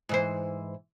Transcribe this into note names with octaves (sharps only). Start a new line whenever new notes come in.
G#2 E3 C5